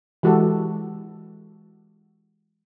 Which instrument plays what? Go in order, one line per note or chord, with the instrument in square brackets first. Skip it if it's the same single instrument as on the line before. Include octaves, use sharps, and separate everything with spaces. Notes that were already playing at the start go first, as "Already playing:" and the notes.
[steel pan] E3 G#3 F#4 G4 A4